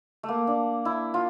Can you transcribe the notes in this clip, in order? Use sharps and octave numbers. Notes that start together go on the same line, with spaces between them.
A3
A#3
D4
E4
F4